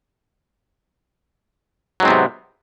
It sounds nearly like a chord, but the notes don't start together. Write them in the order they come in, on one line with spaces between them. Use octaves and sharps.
F#3 G#2 C4 B3 C3